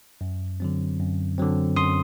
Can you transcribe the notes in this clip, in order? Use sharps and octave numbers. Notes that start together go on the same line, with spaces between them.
F#2
D3 F#3 C4
F#2
D3 F#3 C4
F#2 C6 D#6